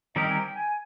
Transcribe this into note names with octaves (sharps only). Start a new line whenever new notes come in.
D#3 G3 C4 G4 A#4 D#5
G#5
G5
G#5